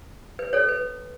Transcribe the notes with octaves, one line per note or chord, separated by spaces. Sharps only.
B4
A4 C#5
B4